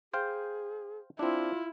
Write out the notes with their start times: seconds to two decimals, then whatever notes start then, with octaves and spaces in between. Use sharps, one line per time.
0.14 G#4 C5 F5 G5
1.19 C4 D4 E4 F4